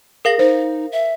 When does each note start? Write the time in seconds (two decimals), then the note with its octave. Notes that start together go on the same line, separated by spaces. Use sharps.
0.25 G#4 A#4 F5 A#6
0.39 D#4 C5
0.92 E5